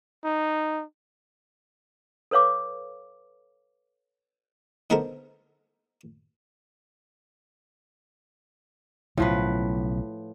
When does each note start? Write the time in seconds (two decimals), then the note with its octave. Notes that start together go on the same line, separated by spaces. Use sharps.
0.24 D#4
2.31 A4 B4 C#5 F5 D6
4.90 D3 B3 D#4 A4 A#4 C5
9.17 B1 A2 C#3 F3 B4